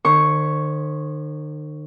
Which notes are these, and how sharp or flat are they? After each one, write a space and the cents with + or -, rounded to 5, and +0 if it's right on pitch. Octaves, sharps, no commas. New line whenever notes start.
D#3 -45 C5 +25 C#6 +0